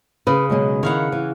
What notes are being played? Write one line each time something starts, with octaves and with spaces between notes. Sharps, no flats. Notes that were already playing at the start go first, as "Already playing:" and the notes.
C#3 B4
B2 F#3 G#3
D#3 E4 C#5 F5 F#5
E3